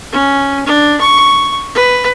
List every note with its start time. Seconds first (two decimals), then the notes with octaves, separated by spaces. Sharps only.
0.13 C#4
0.66 D4
1.01 C#6
1.75 B4